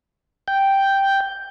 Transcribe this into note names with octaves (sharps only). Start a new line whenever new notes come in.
G5